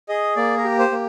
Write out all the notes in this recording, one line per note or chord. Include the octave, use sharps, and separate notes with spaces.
G#4 D#5
A#3 D5
A#4
G4
C5
A#3